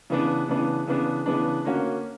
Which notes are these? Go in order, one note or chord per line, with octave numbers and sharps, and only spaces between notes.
C#3 E3 B3 D4
C#3 E3 B3 D4
C#3 E3 B3 D4
C#3 E3 B3 D4
D3 A#3 C#4 F#4